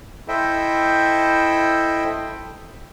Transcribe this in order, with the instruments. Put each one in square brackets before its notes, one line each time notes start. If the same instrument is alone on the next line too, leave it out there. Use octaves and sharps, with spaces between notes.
[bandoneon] E4 A4 C5 D#5 E5 G5